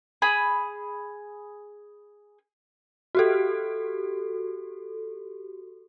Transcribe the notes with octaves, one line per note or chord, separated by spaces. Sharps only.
G#4 B5
F#4 G4 A4